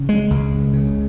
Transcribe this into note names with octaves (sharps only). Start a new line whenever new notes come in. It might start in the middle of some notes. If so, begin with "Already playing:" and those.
Already playing: C#3
G#3
C#2
C#3